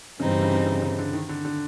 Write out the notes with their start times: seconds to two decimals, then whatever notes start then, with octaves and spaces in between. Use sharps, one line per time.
0.20 G2 C#3 E3 G3 C4 D#4
0.31 C#3
0.39 C3
0.43 C#3
0.55 C#3
0.66 C#3
0.82 C#3
0.98 D3
1.13 D#3
1.29 D3
1.45 D3